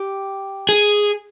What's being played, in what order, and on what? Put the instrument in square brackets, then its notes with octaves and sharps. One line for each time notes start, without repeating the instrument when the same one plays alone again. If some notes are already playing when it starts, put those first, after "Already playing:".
Already playing: [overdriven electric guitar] G4
G#4